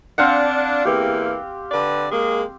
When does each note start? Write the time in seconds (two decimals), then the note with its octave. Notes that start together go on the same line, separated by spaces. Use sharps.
0.18 C4 D4 F5 F#5
0.85 E2 E3 A#3 G4
1.72 D3 B4 D5
2.12 G#3 A#3 G#4